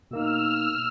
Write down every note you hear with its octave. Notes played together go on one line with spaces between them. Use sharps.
B2 A#3 D#4 E6 F6